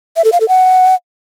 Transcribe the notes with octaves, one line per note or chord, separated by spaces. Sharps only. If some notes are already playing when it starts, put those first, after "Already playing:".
E5
A4
F5
A4
F#5